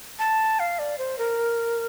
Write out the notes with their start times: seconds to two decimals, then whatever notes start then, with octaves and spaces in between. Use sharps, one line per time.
0.19 A5
0.59 F5
0.79 D5
0.98 C5
1.19 A#4